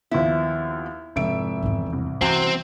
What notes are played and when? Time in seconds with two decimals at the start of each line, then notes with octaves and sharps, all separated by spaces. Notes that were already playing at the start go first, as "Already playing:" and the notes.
0.11 D#2 F3 B3 E4
1.16 F1 G#2 E5 D7
1.62 G#1 E2
1.93 C2
2.21 C3 E3 C4 F#4 G#5